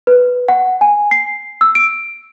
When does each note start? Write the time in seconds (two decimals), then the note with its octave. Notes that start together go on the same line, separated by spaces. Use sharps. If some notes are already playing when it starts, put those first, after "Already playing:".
0.07 B4
0.48 F#5
0.81 G#5
1.11 C7
1.61 E6
1.75 D7